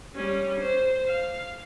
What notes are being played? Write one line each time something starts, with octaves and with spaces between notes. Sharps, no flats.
G3 C#4
C5
F5